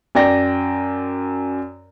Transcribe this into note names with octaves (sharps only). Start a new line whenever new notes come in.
F#2 D5 G5 A#6